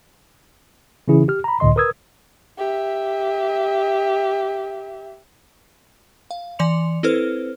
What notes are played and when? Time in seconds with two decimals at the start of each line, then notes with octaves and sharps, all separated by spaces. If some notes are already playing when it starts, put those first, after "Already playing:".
1.08 C#3 E3 C#4 E4 G#4
1.28 G4 F6
1.44 A#5 B5
1.60 C#2 A2 D3 D#5 C6
1.76 A#4 B4 D#6 E6 G#6
2.58 G4 E5
6.31 F5
6.59 E3 D5 C6 C#7 F7
7.03 C4 E4 A4 B4 C5 F6